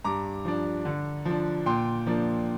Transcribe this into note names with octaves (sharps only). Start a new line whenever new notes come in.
G2 A#5 D6
F3 D4
D3
F3 D4
A#2 G5 C6
F3 A#3 D4